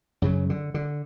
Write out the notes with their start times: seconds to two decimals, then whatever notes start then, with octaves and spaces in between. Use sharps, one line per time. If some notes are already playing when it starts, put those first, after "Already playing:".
0.22 F#2 C#3 F#3
0.50 D3
0.74 D3